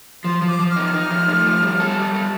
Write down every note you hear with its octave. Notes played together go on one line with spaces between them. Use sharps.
F3 C6
F3
D6
F3
F6
D#4
D#4
F3
A3
F3
G3
A4
G3
A4